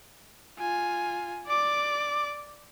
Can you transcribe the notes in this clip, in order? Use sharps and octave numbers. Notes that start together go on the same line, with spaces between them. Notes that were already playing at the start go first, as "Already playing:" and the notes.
F4 G#5
D5 D6